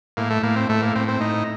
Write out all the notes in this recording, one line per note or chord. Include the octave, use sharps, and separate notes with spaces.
A2 A#3
A3
A2 A#3
C4
A2 A3
A#3
A2 C4
C4
A2 D#4